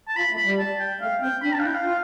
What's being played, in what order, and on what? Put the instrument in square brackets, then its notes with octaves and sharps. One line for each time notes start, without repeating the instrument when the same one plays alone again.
[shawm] A5
[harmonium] F4 [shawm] B5
[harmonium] A3
[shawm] B5
[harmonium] G3
[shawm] A5
G5
[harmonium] A3 [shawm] F5
[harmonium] C4 [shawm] G5
[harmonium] D4 [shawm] B5
[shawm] A5
[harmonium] D4
[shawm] F5
[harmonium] E4 [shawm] G5
[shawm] F5
[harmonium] F4